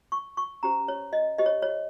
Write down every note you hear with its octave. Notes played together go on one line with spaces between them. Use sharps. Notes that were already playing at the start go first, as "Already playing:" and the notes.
C#6
C#6
C#4 G4 C5 A#5
C#5
D#5
G4 C5 D#5
C#5
C#5